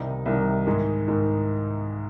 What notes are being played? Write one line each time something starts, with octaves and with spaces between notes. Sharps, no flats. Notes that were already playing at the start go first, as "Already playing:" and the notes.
Already playing: C2 C3 D#3 G3 D#4
C2 C3 D#3 G3
G#2 D#3 G#3 D#4
G#2 D#3 G#3